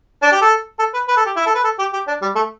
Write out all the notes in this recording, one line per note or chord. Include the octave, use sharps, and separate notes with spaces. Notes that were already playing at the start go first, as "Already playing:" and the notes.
D4
G4
A4
A4
B4
B4
A4
G4
E4
A4
B4
A4
G4
G4
D4
G3
A3